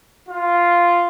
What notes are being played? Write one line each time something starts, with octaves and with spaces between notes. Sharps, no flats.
F4